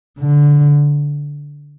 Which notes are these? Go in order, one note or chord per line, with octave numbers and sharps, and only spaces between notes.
D3